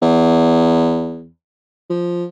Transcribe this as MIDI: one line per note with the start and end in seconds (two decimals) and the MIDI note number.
0.02 1.28 40
1.90 2.26 53